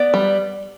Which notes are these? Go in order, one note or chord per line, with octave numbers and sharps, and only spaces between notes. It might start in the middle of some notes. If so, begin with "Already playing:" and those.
Already playing: B3 D5
G3